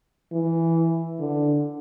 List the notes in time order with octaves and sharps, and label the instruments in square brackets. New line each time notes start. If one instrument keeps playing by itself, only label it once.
[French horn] E3
D3